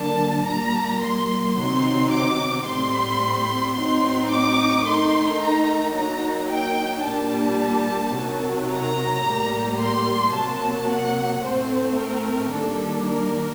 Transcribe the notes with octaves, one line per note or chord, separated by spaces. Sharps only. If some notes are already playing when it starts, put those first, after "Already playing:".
Already playing: D3 F#3 A#3 D4 A5
A#2 G3 A#3 A#5
C6
C3 D#3 F#3 C4 D#4 C6
D6
A2 G3 C4 C6
A2 F#3 C4 D#4 C6
D6
D#3 A3 D#4 C6
A#5
F#3 A#3 D#4 A#5
G5
A#2 G3 A#3 D4 A5
C3 D#3 F#3
A#5
A2 G3 A#3
C6
C3 F#3 A#3 A5
F#5
A2 A3 C4 C5
A#4
D#3 G3 A#3 D4 A4
A#4